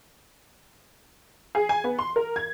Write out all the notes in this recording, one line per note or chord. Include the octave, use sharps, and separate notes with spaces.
G#4
G#5
B3
C6
A#4
G#6